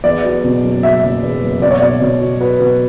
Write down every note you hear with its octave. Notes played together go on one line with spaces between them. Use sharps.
E2 D5
F#3
B2
F#1
F#3 E5
F#1
E2
F#1
B2 D5
C#5
B2 D5
B2
F#3
F#3 B4
B2